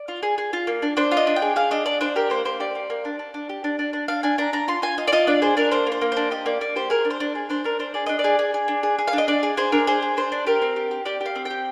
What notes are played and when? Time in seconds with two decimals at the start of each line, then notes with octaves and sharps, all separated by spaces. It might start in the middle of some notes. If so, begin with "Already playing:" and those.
Already playing: D5
0.08 F4
0.23 G#4
0.38 G#4
0.53 F4
0.67 A#3
0.82 D4
0.97 D4 C5
1.11 F4
1.17 D#5
1.27 D4
1.36 G5
1.42 G#4
1.56 G#4 F5
1.71 D4 D#5
1.86 D4 D5
2.01 D4 C5
2.16 G4 A#4
2.30 A#3 C5
2.45 A#3 C5
2.60 G4 D5
2.75 A#3
2.90 A#3
3.05 D4
3.19 D4
3.34 D4
3.49 G4
3.64 D4
3.79 D4
3.93 D4
4.08 D4 F5
4.23 D4 G#5
4.38 D4 A#5
4.53 D4 A#5
4.68 F4 C6
4.82 F4 G#5
4.98 F4 D#5
5.07 D5
5.12 F4 D#5
5.27 D4 D5
5.42 G#4 C5
5.57 D4 A#4
5.71 A#3 C5
5.87 A#3
5.92 C5
6.01 A#3
6.12 D4 C5
6.31 G4 D#5
6.46 A#3 D5
6.61 A#3 D5
6.76 G4 C5
6.90 G#4 A#4
7.05 D4
7.10 C5
7.20 D4
7.35 G#4
7.49 D4 C5
7.64 D4 A#4
7.79 D4 C5
7.94 G#4 D5
8.06 D4 D#5
8.19 D5
8.24 G#4
8.39 G#4
8.54 G#4
8.68 D4
8.83 G#4
8.99 G#4
9.08 F5
9.13 D4
9.18 D#5
9.28 D4 D5
9.43 G#4
9.57 G#4 C5
9.72 D4 A#4
9.87 G#4 C5
10.02 G#4
10.17 D4 C5
10.32 D4
10.47 G4 A#4
10.62 C4
10.76 G4
10.91 G4
11.05 G4 D5
11.21 G4 F5
11.35 C4
11.45 G5
11.50 G4